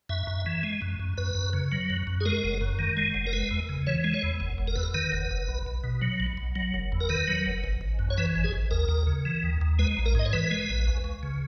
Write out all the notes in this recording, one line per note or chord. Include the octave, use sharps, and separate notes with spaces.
F#2 E5
F#2
E3
G#3
F#2
F#2
F#2 B4
F#2
C#3
F#3
F#2
F#2
G#4
G#3 A#4
F#1
F#2
D#3
G#3
F#1
A#4
G#3 B4
E2
C#3
E3 C#5
G#3
C#5
E2
F#1
F#1
A#4
E2 B4
A#4
D#3 B4
F#1
F#1
B1
B1
B2
F#3
B1
B1
F#3
F#1
E2
A#4
D#3 B4
F#3
F#1
G#1
G#1
F#2
C#5
E3 B4
G#1
G#4
G#1
D#2 A#4
D#2
C#3
E3
D#2
D#2
G#3 B4
A#1
A#4
G#2 D#5
C#5
E3 B4
G#3
A#1
C#2
C#2
C#3